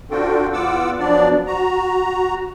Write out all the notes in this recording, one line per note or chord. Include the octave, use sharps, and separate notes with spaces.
C4 D4 F4 F#4 A4 G5
E2 B3 F4 F#5 D6 E6
F3 F#3 B3 D4 D5
F#4 A#5